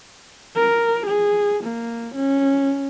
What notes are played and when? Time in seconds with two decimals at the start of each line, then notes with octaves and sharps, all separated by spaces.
0.56 A#4
1.06 G#4
1.63 A#3
2.15 C#4